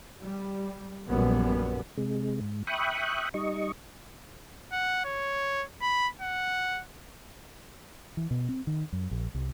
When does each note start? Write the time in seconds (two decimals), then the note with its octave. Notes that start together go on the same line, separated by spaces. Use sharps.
0.22 G3
1.08 A#1 F#2 G3 B3
1.98 C3 G#3
2.41 G#2
2.67 E5 G5 B5 C#6 D#6 F#6
3.34 G3 D#4 D#5 C#6
4.72 F#5
5.05 C#5
5.81 B5
6.21 F#5
8.17 E3
8.31 B2
8.49 C4
8.67 D#3
8.93 F#2
9.11 A#1
9.35 C2